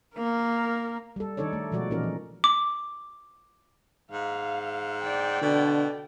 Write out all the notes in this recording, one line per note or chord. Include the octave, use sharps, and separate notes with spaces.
A#3 A#4
G3 A4
D#3 D4 D#4 A4 C#5 D5
A3
B2 F3 G#3 F#4 D5
A#2 E3 C#4 D#4 A#4
F3
D6
G#2 F5
D5 G5
B2 D3